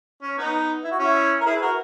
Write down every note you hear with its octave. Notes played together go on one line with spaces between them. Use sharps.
C#4
B3 D#4
E4
F#4
C#4 E4
A#4
E4 G#4
B4
F#4 A#4